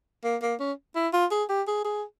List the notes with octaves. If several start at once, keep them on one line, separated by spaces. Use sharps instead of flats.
A#3
A#3
C#4
E4
F4
G#4
G4
G#4
G#4